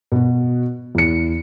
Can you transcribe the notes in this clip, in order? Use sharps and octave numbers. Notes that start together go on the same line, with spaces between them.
B2 F#4
E2 C#7